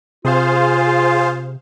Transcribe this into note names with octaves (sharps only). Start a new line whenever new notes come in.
C3 F4 G#4 C5 F5